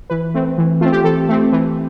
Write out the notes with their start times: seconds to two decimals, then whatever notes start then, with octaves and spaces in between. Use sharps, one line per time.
0.10 E3 B4
0.34 A3 C4
0.58 E3
0.81 A3 C4 F4
0.92 G4
1.04 E3 A4
1.29 A3 C4
1.52 E3